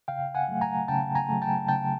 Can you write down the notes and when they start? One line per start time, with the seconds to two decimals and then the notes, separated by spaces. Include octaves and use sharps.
0.08 C#3 F5 G5
0.35 F#5 G#5
0.48 F#3 A3
0.61 G#5 A#5
0.88 C#3 G5 A5
1.15 G#5 A#5
1.29 F#3 A3
1.42 G5 A5
1.68 C#3 G5 A5